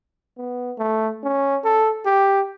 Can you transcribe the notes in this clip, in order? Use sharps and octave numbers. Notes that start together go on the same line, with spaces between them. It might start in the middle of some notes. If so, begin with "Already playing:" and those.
B3
A3
C#4
A4
G4